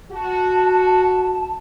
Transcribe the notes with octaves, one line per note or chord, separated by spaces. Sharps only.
F#4 A5